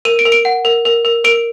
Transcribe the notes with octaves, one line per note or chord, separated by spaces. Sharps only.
A#4 D#7
D7
A#4
D7
F#5
A#4
A#4
A#4
A#4 D7